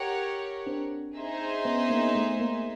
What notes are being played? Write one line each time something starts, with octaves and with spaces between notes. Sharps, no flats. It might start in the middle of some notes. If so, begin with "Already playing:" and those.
Already playing: G4 A#4 C#5 F#5
C4 D4
D#4 G#4 C5 E5
B3 C#4
A#3 C4
A3 B3
A#3